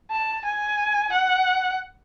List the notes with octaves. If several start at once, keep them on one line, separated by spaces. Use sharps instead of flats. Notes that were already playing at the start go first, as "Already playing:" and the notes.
A5
G#5
F#5